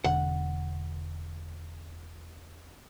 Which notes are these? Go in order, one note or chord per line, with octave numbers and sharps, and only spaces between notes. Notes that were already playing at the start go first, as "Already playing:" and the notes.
E1 D3 F#5